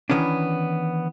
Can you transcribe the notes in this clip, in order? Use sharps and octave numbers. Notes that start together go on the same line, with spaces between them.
D#3 E3 B3 C#4 D4